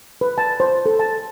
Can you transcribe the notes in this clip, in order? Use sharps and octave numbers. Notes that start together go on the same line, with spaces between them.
B4
A5
C5
A4
A5